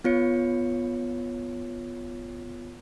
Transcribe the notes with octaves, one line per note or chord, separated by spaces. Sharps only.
B3 F4 C#5 C#7